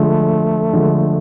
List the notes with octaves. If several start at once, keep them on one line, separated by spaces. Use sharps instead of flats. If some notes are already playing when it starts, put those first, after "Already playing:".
Already playing: D3 F3 G#3 A3
D3 F3 G#3